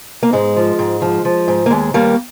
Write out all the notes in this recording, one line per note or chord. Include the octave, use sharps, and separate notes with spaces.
A#3
G#2 G#3
F3
G#2
F3
F3
G#2
A#3
D#2 G#3
D#2 G3 A#3